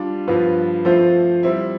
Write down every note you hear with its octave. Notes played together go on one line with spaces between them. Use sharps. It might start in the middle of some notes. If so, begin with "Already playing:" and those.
Already playing: G3 D4 F4
G2 F3 B3 F4 B4
F3 A3 C4 F4 C5
G3 C4 E4